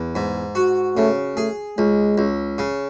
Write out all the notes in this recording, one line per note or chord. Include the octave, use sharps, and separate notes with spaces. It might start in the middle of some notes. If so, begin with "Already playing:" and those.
Already playing: E2
G#2
F#4
C#3 A3
A3 G#4
C#2 G#3
C#2
C#3